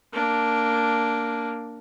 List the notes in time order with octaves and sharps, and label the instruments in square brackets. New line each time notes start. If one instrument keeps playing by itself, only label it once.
[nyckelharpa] A#3 D4